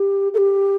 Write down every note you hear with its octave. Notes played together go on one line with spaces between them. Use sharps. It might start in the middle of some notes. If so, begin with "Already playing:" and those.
Already playing: G4
A4
G4